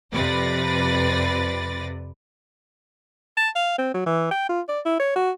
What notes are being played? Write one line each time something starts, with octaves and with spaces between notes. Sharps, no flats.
F2 C3 B4 D5 A6 A#6
A5
F5
C4
F#3
E3
G5
F4
D5
E4
C#5
F#4